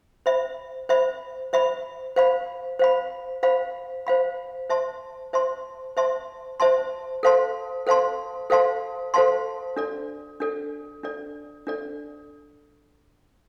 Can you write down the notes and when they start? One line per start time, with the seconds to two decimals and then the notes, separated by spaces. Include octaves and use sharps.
0.26 C5 E5 B5
0.89 C5 E5 B5
1.53 C5 E5 B5
2.16 C5 F5 B5
2.79 C5 F5 B5
3.43 C5 F5 B5
4.07 C5 F5 B5
4.70 C5 E5 A5 C6
5.33 C5 E5 A5 C6
5.97 C5 E5 A5 C6
6.60 C5 E5 A5 C6
7.23 A4 C5 F5 A5 C6
7.87 A4 C5 F5 A5 C6
8.50 A4 C5 F5 A5 C6
9.14 A4 C5 F5 A5 C6
9.76 D4 A4 D5
10.40 D4 A4 D5
11.03 D4 A4 D5
11.67 D4 A4 D5